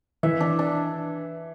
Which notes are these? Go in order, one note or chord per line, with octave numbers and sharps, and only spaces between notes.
E3 E5
D4
D4